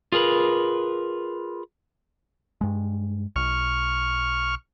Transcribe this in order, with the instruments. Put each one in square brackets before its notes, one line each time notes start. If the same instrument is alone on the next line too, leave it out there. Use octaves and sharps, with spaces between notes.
[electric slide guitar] F4 G#4 A#4 B4
[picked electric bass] G2 G#3
[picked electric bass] B1 [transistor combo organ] C#6 F6